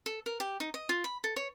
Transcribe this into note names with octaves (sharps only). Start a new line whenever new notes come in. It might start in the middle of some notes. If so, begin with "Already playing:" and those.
A4
A#4
G4
D#4
D#5
F4
B5
A4
C#5